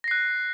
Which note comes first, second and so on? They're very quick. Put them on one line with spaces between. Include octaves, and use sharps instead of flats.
A#6 C7 F#6